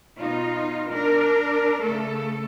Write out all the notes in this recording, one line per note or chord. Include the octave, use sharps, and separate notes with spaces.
B2 D#4 F4
D4 A#4
C#3 A3 A4